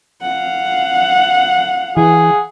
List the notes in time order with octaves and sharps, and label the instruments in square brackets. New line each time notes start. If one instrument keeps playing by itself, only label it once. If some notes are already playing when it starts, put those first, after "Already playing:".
[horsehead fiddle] F5 F#5
[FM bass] E3 [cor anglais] G#4